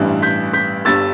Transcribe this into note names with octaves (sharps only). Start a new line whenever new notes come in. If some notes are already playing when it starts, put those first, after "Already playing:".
Already playing: A1 G2 E3 G3
G6 B6
G6 B6
G1 G2 D3 G3 E6 A6